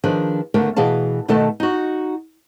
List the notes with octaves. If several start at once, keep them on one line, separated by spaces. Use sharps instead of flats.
D#3 F3 D4 G#4 B4
D#2 D3 A3 B3 A#4
B2 E3 G#4 F5 A5
B2 D#3 A3 A4 B4 A5
D#4 F#4